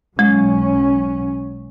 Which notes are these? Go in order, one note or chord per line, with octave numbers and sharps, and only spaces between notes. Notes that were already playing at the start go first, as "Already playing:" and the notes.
B1 F#3 G#3 C#4